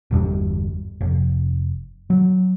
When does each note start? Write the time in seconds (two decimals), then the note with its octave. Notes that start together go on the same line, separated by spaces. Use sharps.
0.11 G1 E2 G3
1.01 F1
2.10 F#3